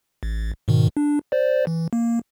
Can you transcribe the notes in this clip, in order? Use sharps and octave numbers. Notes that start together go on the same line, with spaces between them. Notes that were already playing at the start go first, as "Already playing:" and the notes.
A1
G#2 B2 D#3
D4
C5 D5
E3
A#3